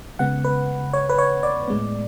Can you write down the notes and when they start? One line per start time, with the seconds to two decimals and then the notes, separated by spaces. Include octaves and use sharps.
0.19 C#3 G#3 B3 F#5
0.45 B4
0.93 C#5
1.09 B4
1.18 C#5
1.43 D5
1.68 A2 G#3 B3